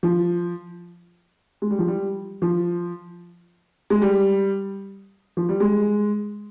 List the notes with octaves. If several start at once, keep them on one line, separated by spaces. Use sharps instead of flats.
F3
G#3
G3
F3
G3
F3
G#3
G3
F3
G3
G#3